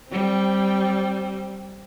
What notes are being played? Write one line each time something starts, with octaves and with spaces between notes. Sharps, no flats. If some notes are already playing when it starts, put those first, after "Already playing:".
G3 C4